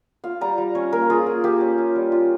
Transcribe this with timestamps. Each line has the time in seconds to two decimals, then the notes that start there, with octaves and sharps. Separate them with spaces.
0.24 F4 F5
0.41 G3 A#5
0.58 G3
0.75 C#4 C#5
0.93 A#3 A#4
1.10 F4 G#4
1.26 A#3
1.44 A#3 G4
1.61 C#4
1.78 F4
1.96 G3
2.12 F4